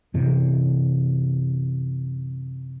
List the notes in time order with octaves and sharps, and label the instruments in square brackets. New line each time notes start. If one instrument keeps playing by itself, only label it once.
[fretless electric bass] F#2 C3 E3